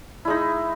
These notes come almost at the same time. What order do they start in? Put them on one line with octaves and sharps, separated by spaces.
E4 G#3 D#4